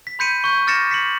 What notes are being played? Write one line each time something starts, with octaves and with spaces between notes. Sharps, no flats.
B6
B5 C6 G6 B6 C#7 D#7
C#6 G6
D6 F6 A6 A#6 C#7 E7
B6 C#7 F#7